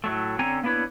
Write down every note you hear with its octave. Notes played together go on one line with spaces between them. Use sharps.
A2 F#3 A3
D3 C4 C#4 C#5 G#5 A#5
A#3 B3 D4 E4 B4 C#5